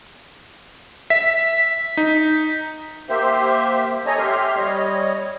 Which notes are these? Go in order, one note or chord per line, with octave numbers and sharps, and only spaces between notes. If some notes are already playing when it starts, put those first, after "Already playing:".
E5 B6
D#4
A#3 G4 C5 E5
A4 C#5 D#5 G#5 A#5
G4 E5 C6 F6
G3 C#5 D#5